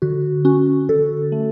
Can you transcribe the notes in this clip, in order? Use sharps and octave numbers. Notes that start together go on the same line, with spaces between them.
D3 F#4
C#4 F#4
D3 A4
A3